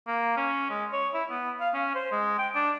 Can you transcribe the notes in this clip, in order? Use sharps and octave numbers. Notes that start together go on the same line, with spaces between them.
A#3
C#4
G#3
C#5
E4
B3
F5
C#4
C5
G#3
G5
D4